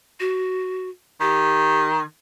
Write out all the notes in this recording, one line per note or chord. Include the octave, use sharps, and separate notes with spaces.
F#4
D#3 G4